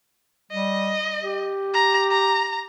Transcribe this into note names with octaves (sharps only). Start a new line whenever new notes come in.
G3 D#5
G4
A#5
A#5